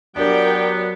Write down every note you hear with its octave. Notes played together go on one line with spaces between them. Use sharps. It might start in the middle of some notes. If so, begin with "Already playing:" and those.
F#3 B3 D4 G4 A#4 D5 G5